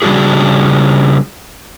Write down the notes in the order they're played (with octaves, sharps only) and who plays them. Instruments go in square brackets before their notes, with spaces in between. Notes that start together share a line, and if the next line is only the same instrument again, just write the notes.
[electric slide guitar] C#3 G3 B3 D4 F#4 G#4